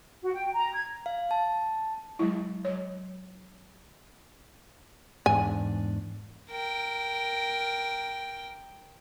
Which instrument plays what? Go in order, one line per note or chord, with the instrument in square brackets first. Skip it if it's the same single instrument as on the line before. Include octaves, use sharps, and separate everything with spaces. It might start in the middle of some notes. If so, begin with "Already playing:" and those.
[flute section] F#4
G5
A#5
G#6
[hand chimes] F5
A5
[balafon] F#3 G#3 E4
F#3 C#5
[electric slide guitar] E2 G#2 D4 [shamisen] G#5
[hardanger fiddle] A#4 G5